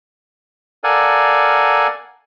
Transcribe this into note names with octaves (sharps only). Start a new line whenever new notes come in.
A4 A#4 D5 F5 F#5 G#5